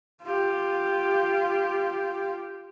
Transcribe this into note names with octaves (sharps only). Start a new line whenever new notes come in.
F4 G4